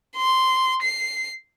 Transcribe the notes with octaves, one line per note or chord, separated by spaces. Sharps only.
C6
C7